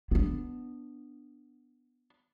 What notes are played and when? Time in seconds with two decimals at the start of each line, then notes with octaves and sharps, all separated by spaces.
0.11 B3 D4